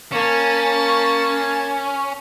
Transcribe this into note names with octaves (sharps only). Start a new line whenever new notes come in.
A#3 C#4 A5